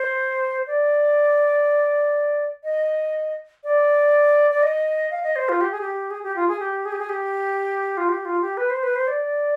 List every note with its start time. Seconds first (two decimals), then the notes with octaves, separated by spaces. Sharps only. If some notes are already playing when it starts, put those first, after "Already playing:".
Already playing: C5
0.67 D5
2.64 D#5
3.64 D5
4.51 D5
4.63 D#5
5.11 F5
5.23 D#5
5.36 C5
5.49 F4
5.61 G4
5.72 G#4
5.81 G4
6.10 G#4
6.23 G4
6.36 F4
6.48 G#4
6.60 G4
6.85 G#4
6.92 G4
6.99 G#4
7.09 G4
7.97 F4
8.09 G4
8.25 F4
8.41 G4
8.57 B4
8.70 C5
8.83 B4
8.96 C5
9.08 D5